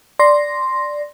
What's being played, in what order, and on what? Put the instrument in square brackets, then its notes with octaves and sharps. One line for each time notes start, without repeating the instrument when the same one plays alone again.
[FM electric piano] D5 C6 A#6